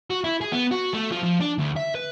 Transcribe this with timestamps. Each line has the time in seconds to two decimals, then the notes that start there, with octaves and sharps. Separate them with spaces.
0.10 F#4
0.24 E4
0.41 G#4
0.52 B3
0.71 F#4
0.94 A3
1.12 F3
1.24 F3
1.41 D4
1.59 D2
1.77 E5
1.95 B4